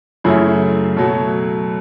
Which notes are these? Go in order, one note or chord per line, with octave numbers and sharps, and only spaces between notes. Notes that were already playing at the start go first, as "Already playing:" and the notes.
F#2 C#3 F#3 A3 E4
B2 F#3 A3